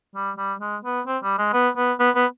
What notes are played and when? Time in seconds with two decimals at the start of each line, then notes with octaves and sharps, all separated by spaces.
0.15 G3
0.38 G3
0.61 G#3
0.85 B3
1.07 C4
1.23 G3
1.38 G#3
1.53 B3
1.77 B3
2.00 B3
2.15 B3